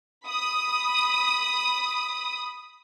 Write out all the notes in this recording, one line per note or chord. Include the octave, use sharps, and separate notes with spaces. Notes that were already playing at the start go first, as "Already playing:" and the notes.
B5 D#6